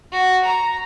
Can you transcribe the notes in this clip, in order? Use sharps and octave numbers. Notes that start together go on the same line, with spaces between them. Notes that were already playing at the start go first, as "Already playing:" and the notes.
F#4
A#5